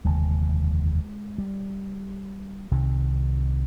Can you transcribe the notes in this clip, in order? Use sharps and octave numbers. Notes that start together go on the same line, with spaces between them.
F1 D#2 D3 G#3
G3
C2 C3 D#3